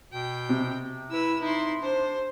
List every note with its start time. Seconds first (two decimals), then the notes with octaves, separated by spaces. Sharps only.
0.12 B2 G5
0.49 C3
1.11 E4 B4 E6
1.42 D#4 E4 C6
1.82 D4 C5